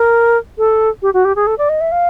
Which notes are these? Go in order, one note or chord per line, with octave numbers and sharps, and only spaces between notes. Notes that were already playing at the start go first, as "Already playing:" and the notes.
Already playing: A#4
A4
G4
F#4
G4
G#4
A4
D5
D#5
E5
F5